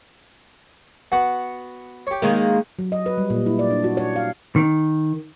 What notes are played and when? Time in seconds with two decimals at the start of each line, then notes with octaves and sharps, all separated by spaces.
1.12 B3 F#4 F#5
2.07 G4 C#5
2.22 D#3 G#3 A#3
2.79 F#3
2.92 D#5
3.06 B4
3.18 G3
3.30 A#2
3.46 E4
3.59 D5
3.71 D4
3.84 F#4
3.97 C#5
4.16 F5
4.56 D#3